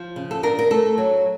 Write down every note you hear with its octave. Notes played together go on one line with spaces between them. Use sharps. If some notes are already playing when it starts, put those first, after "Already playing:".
Already playing: F3
C#3
A4
D4 A#4
A#4
A3 A4
F#3